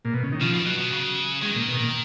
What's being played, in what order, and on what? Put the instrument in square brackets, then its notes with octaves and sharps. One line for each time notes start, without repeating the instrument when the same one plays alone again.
[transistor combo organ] A#2
B2
C#3
D#3
[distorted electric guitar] B2 [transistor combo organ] F3
[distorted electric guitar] B2
[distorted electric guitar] B2 [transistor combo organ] F#3
[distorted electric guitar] B2
C#3
[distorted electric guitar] D#3 [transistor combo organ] G#3
[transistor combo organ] A#2
B2
A#2